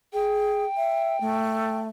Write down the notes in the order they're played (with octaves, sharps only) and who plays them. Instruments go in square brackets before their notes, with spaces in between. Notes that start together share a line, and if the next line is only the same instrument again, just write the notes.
[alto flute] G#4 [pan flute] G5
[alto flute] E5
A3